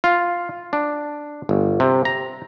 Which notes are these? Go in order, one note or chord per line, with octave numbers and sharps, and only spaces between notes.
F4
D4
G1
C3
A#5